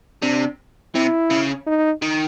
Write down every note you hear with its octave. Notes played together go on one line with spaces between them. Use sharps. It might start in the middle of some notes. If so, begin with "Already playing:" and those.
C3 D4
C3 E4
C#3
D#4
D#3